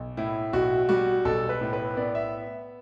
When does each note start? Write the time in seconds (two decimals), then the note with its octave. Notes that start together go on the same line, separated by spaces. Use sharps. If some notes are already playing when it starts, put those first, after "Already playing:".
Already playing: B1
0.17 A2 E4
0.53 B1 F#4
0.89 G3 F#4
1.25 B1 A4
1.49 B4
1.61 A2
1.73 B4
1.97 B3 D5
2.15 E5